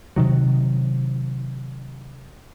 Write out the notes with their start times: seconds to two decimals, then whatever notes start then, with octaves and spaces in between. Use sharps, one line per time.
0.16 C3 D#3 F#3